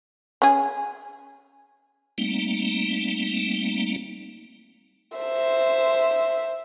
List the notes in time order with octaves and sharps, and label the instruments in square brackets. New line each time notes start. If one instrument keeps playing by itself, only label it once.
[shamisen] C#4 G#4
[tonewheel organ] G3 A3 A#3 C4 D#4
[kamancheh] C5 E5